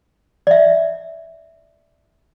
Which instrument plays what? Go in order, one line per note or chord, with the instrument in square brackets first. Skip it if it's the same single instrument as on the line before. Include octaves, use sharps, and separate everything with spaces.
[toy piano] D5 E5